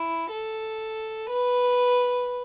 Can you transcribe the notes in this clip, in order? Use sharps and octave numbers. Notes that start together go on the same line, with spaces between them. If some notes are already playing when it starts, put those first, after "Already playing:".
Already playing: E4
A4
B4